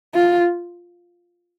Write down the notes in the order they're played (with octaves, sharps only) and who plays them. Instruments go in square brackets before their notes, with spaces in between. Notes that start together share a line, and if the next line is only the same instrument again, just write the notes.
[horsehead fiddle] F4